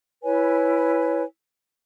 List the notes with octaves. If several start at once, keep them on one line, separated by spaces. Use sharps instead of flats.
E4 B4 C#5 G#5